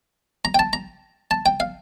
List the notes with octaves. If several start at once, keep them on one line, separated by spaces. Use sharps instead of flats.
A#5
G5
A5
A#5
A5
G5
F5